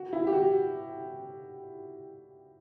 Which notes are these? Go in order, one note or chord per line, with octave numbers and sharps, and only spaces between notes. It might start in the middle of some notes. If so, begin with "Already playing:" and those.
Already playing: F#4
E4
G4
F#4